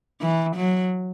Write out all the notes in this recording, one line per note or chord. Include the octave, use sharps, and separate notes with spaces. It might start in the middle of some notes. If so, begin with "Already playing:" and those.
E3
F#3